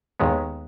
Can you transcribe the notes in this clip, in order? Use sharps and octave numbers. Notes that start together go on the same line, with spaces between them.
D#2 D#3 G#3 B3